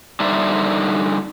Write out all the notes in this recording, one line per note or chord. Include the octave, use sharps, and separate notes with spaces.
D3 G3 D#4 C5 D5 E5